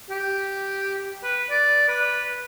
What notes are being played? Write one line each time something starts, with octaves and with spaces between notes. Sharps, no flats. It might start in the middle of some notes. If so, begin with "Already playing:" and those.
G4
B4
D5
B4